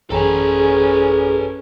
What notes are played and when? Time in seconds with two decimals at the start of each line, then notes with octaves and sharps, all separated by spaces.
0.10 A1 F#2 C#4 G#4 A4 B4 A#5